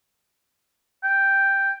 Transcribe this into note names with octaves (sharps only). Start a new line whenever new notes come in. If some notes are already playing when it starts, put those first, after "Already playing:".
G5